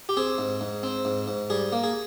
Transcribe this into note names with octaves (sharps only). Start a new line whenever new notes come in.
G4
C4 G#4
G#2
G#2
C4
G#2
G#2
G3 G#4
A#3
G#4